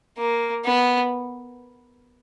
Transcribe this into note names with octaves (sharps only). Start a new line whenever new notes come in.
A#3
B3